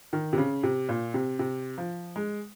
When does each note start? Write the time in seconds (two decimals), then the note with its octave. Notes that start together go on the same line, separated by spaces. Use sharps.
0.13 D#3
0.33 C3
0.38 C#3
0.63 C3
0.89 A#2
1.14 C3
1.39 C3
1.78 F3
2.16 G#3